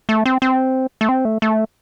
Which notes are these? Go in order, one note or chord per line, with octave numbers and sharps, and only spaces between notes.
A3
C4
C4
A3
C4
A3
A3